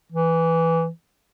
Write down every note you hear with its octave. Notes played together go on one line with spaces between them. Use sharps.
E3